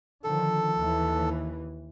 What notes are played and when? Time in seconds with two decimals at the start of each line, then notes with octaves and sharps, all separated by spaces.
0.24 D3 D#3 F3 A4
0.77 D#2 E3